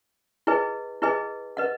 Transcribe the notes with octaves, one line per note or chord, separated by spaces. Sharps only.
E4 G#4 B4 D#5 G#5
E4 G#4 B4 D#5 G#5
B4 D#5 F#5